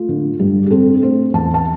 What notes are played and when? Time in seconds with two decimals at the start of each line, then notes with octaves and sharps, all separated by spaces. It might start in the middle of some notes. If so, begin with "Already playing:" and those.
Already playing: A3 F4
0.09 D3
0.39 G2 G4
0.66 G4
0.71 C4 A4
1.02 A3 C5
1.33 E2 A5
1.54 A5